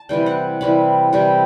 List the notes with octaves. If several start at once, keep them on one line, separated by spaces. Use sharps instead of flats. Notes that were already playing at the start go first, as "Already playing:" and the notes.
Already playing: A5
C3 E3 G3 G5
F#5
C3 E3 G3 B5
C3 E3 G3 G5